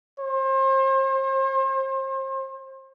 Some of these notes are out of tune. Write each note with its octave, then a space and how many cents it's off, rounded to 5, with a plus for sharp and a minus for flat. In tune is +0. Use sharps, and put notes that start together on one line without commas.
C5 +35